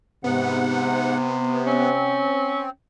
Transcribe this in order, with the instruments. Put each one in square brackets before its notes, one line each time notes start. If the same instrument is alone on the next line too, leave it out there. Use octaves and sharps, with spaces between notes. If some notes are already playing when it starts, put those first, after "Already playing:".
[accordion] G#2 F#5 [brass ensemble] C3 [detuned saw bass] B3
[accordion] C4 [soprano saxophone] C#4